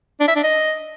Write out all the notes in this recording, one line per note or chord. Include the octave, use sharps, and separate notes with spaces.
D4
E5
D4
D#5